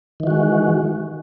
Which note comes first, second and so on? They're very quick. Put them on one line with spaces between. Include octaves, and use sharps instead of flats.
D#3 E3 F#4 G#3